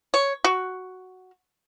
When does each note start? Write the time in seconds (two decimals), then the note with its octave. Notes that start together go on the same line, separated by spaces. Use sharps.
0.14 C#5
0.44 F#4